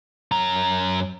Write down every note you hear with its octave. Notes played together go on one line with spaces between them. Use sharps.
F#2 A#5